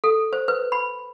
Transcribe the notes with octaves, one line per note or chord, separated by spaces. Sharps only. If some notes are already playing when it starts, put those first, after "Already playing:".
A4
C5
B4
B5